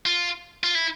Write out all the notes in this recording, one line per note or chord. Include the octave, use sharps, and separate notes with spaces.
F4
F4
E4